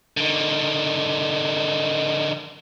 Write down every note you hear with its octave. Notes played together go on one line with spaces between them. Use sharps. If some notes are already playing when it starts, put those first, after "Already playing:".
D3 D#3